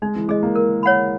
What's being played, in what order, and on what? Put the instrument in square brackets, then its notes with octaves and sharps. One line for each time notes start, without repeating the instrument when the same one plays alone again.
[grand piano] G#3 [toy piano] D#4
[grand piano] E3
[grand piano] G#3 [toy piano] G#4 D#5
[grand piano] A#3
[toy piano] A#4
C#5 F#5 B5